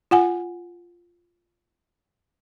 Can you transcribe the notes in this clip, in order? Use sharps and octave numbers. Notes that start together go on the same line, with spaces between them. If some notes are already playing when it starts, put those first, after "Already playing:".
F4 F#5 G#5